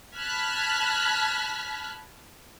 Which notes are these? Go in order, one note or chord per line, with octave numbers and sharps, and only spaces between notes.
A5 B5 F6 F#6 G#6 B6